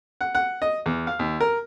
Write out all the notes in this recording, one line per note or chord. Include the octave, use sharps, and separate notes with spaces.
F#5
F#5
D#5
E2
F5
D#2
A#4